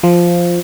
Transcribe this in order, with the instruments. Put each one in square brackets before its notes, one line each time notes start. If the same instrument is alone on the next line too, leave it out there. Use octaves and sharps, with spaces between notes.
[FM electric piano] F3